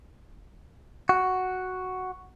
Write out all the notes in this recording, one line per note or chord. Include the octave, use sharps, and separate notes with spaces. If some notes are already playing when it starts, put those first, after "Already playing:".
F#4